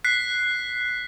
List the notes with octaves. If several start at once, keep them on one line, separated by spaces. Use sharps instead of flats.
F#6 B6 C7